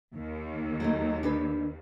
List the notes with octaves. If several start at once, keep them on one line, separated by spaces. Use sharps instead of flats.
D#2
F#3 A3 D#4
D4 G4 B4